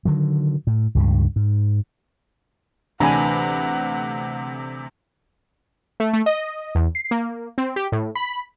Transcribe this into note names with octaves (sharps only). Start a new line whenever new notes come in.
D3 D#3 F#3
A2
C#2 G2 C#3
G#2
D2 C3 E3 D4 F#5 G#5 A#5 B5
A3
A3
D#5
E2
C7
A#3
C4
G4
A2
B5